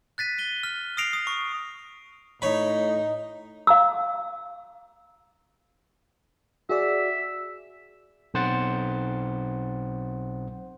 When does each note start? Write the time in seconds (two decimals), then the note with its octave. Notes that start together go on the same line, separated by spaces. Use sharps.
0.18 F#6 A6 B6 D#7
0.38 A6 D#7 G7
0.63 F6
0.97 D#6 F6 A#6 C7 D7 F7
1.13 D#6
1.27 C#6
2.42 A2 D#4 C#5 B5
3.67 F5 A#5 E6
6.69 F#4 G#4 D5 E5
8.34 B1 C4 C5 F#5 A6